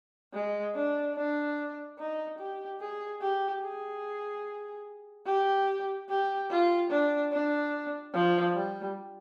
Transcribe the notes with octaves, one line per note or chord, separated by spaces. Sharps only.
G#3
D4
D4
D#4
G4
G#4
G4
G#4
G4
G4
F4
D4
D4
F3
G3